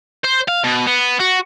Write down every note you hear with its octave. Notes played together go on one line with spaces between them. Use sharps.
C5
F5
B2
B3
F#4